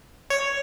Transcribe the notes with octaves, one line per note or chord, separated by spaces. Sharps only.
C#5